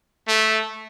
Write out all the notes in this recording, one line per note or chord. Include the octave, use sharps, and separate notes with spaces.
A3